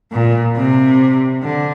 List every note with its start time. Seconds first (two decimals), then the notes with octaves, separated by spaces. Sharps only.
0.13 A#2
0.56 C3
1.43 D3